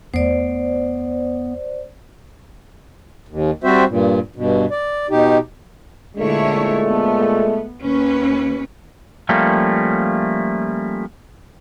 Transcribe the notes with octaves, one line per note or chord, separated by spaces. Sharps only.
E2 A3 B3 C5 D5
D#2
G3 C4 F#4 C5 E5
G2 A#2
G2 B2
D5
B2 D#4 G4
A#2 D3 G#3 A3 E4 C#5
B3
D#2 C#4 B4
F3 G3 A3 A#3 C#4